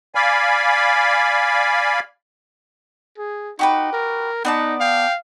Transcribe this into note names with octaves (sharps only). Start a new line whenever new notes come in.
D5 F5 G#5 B5
G#4
D#4 F#4 G4 B4
A#4
B3 D#4 D5 A5
F5 G5